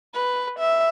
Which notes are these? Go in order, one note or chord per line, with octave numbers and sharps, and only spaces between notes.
B4
E5